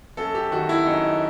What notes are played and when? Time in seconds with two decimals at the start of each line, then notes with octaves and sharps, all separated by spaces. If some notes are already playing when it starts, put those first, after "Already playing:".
0.17 F#2 A4
0.35 G4
0.51 D#3 F#4
0.69 E4
0.86 F#2 D#4